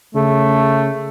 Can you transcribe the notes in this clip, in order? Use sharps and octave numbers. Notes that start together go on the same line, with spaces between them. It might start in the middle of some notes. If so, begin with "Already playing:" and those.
C#3 A3